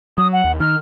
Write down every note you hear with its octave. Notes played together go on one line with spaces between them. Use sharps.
F#3 D#6
F#5
D#2
D#3 F6